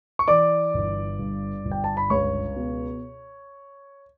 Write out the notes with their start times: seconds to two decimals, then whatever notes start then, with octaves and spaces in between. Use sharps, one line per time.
0.19 C#6
0.28 E3 D5 D6
0.74 G1
1.19 G2
1.65 G1
1.72 G5
1.84 A5
1.97 B5
2.10 C#2 C#5 C#6
2.56 B2